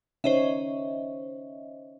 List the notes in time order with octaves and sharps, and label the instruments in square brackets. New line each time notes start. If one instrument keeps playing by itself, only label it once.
[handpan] C#4 D#4 C#5 [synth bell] C5 D#5 E5